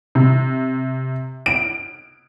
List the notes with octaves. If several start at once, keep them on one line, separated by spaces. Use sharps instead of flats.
C3
D7